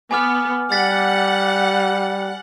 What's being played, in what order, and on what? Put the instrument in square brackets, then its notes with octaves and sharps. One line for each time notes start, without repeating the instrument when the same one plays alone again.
[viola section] B3 [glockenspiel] G#5 D6 F6
[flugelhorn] G3 [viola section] F#5 [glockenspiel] A6 B6